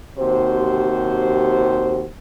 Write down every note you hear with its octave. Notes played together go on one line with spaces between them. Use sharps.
D#2 C3 F#4 C5